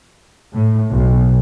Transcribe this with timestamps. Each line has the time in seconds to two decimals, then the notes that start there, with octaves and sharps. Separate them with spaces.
0.54 A2
0.91 B1